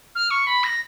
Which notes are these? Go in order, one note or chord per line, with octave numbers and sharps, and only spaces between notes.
F6
C#6
B5
A#6